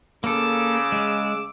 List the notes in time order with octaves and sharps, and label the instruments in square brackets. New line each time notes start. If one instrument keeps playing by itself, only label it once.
[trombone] C#3 [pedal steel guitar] A#3 A4 [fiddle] D6 E6
[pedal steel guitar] G#3